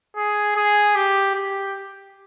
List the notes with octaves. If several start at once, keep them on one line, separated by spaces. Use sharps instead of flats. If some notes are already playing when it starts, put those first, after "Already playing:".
G#4
G#4
G4
G4